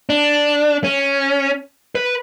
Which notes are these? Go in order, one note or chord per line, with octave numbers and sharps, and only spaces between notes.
D4
C#4
B4